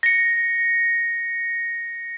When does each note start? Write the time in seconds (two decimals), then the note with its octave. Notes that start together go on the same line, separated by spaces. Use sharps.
0.03 A#6 C#7